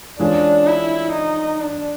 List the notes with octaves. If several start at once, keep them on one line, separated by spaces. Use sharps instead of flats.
E3 G#3 C#4 D4 F4 G#4
E4
D#4
D4